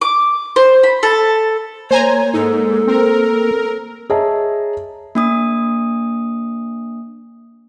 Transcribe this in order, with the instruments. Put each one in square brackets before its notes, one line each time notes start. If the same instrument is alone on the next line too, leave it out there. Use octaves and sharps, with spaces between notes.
[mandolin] D6
C5
B5
A4
[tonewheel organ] A#3 [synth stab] C5 G#5 A#5 [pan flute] C#5
[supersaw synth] G#2 [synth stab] D#4 [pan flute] A4
[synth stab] C4 [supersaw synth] A#4
[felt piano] G#4 C#5 D#5 E5 A5 A#5
[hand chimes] A#3 D4 D#6